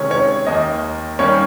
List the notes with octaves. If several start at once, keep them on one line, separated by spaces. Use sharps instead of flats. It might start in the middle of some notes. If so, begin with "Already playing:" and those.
Already playing: C3 D#3 G#3 C#4 C#5
C#5
D#2 D#3 A#3 D#5
D#2 D#3 G3 A#3 C#4 C#5